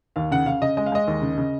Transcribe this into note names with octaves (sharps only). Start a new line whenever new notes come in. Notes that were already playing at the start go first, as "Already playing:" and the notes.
D#2 F5
C#3 F#5
C#3 F5
C#3 D#5
G#3 D#5
F5
G#3 D#5
D#2
C#3
C#3